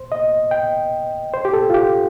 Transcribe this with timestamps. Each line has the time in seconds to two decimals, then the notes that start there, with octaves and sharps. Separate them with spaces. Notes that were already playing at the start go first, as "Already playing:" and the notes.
Already playing: C5
0.12 D#5
0.51 G5
1.34 C5
1.45 G4
1.53 A4
1.70 F4
1.74 G4